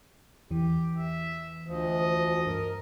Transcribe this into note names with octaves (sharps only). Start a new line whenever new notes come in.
E2 E3 G4
E5
D2 F3 D#5
G2 A#4